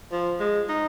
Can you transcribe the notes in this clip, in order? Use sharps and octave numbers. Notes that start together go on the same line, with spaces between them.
F3
G#3
D#4